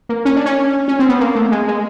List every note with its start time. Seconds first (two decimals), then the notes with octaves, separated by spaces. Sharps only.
0.09 A#3
0.25 C#4
0.36 D4
0.46 C#4
0.88 C#4
0.99 C4
1.09 B3
1.20 A#3
1.35 A3
1.51 G#3
1.68 G#3